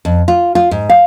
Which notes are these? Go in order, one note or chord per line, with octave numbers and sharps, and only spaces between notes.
F2
F4
F4
G#2
F5